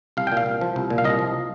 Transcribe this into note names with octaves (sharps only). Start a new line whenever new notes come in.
C2 F5
A#2 G5
F5
C2
F3
C2
A#2
F5
C2 D#5
F3